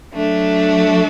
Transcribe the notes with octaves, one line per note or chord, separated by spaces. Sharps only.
F#3 A3 D4